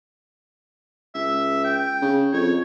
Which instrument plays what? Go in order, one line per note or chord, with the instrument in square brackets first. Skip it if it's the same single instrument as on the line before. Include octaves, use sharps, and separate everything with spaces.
[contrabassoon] C#2 [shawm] E5
[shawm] G5
[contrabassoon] C#3
[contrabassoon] F2 [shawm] C#5